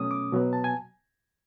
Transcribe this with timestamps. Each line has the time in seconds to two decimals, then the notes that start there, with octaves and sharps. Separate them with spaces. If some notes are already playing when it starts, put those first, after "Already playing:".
Already playing: B2 F#3 A3 C#4 D#6
0.11 D6
0.33 B2 F#3 B3
0.53 A5
0.64 G#5